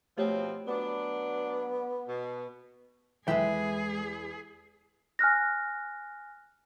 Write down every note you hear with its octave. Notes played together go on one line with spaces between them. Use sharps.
B2 F3 A3 C4 G4 C#5
F#3 B3 D4
B2
E2 G#3 G#4 A4 B4 E5 G5
G#5 F6 F#6 A#6